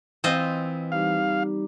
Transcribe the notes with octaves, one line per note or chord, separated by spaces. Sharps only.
E3 C4 F4 D#5
G3 D#4 G4 F5